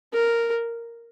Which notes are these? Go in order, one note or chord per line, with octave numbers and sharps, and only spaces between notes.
A#4